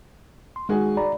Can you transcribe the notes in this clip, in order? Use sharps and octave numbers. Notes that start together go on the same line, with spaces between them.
C6
D#3 G#3 F#4 G#4
D5 A#5 B5